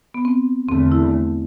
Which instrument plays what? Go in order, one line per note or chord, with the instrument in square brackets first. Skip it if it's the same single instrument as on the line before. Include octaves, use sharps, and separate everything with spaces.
[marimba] B3
C4
[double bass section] E2 D3 A3 [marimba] C4
[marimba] E4